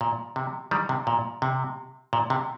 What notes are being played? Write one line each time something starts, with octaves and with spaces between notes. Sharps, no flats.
A#2
C3
D#3 G3
C3
A#2
C3
A#2
C3